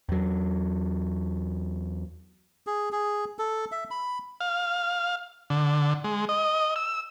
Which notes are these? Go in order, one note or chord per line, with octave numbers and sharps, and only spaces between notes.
E2 F#3
G#4
G#4
A4
E5
B5
F5
D3
G#3
D#5
E6